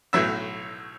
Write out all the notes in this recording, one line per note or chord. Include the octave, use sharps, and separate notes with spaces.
B1 A2 F#3 E5